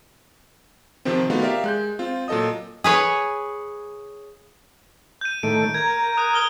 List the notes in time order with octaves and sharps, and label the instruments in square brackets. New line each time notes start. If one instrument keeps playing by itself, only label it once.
[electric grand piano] C3 D#3 F3 C4
A3 B3 D#4 F4 F#4
G4 A#4 D5 E5 F5
G#3 F#6 G6
C4 F4
A#2 F#3 A4 D#5 D#6
[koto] G#4 B4 C#5
[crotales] G6 D#7
[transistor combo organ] A2 D#3 A3 [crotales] D7
[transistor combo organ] A#4 [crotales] G#6
[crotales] D#6 F#6 D#7
D#6 F6 G7